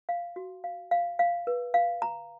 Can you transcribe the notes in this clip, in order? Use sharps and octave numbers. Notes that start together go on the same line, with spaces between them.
F5
F#4
F5
F5
F5
B4
F5
A#5